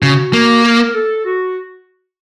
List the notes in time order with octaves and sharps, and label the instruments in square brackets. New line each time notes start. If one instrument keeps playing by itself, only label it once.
[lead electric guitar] C#3 [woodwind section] F#4
[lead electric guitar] A#3
[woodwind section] A#4
A4
F#4